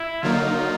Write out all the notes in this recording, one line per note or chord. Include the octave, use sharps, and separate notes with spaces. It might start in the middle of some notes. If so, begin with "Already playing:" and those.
Already playing: E4
D3 F#3 A#3 D#4 F4